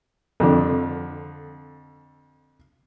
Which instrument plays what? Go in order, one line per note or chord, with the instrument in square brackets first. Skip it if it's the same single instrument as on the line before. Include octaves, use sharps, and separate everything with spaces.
[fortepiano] F2 D3